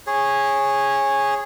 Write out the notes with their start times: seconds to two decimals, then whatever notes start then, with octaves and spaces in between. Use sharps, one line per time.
0.07 G#4 C#5